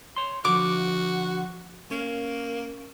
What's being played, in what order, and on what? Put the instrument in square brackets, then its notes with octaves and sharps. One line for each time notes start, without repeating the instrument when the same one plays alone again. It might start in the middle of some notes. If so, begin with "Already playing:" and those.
[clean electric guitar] C#5 C6
[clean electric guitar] D3 F3 [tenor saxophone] F#4 [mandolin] D6
[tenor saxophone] A#3 [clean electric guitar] C#4